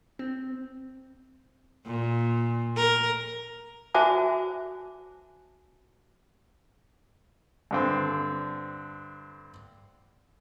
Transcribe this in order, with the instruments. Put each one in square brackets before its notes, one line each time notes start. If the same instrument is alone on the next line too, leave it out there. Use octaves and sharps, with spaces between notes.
[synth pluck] C4
[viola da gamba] A#2
A#4
[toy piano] F#4 C5 E5 G#5 A5 D6
[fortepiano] G2 D3 C4